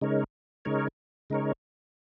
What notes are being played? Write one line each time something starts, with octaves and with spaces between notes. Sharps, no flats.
C#3 G#3 D#4 A#4 C#5
C#3 G#3 D#4 A#4 C#5
C#3 G#3 D#4 A#4 C#5